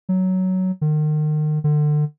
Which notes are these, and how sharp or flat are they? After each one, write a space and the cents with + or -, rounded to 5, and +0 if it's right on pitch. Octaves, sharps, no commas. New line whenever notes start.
F#3 +10
D#3 -35
D3 +30